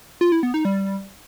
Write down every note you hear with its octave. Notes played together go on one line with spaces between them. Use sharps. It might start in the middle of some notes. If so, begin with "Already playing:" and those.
F4
E4
B3
D#4
G3